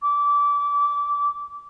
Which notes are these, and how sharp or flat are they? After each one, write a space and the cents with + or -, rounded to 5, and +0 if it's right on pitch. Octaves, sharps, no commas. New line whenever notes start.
D6 -25